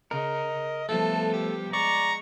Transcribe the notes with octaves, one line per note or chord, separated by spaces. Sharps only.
C#3 A#4 D#5
F3 G3 A3 B3 A4
G4
G#3 D5 A#5 C#6